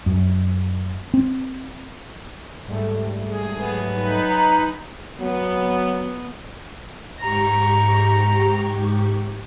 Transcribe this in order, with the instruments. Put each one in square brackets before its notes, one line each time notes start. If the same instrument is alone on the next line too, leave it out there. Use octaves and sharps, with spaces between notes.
[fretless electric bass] F#2
C4
[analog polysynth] G#2 G3 A3
[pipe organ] G#4
[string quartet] F#3 B3 G#5
[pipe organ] D#4 B4
[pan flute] A#5
[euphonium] F#3 [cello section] B3
[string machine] G#2 G4 C#6 [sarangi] A#5